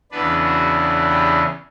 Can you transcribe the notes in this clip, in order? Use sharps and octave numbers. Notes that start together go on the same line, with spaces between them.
E2 C#3 E3 B3 D4 B4
F#4
G4